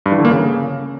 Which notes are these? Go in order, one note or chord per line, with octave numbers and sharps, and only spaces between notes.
G2
E3
D3
A#3
C#3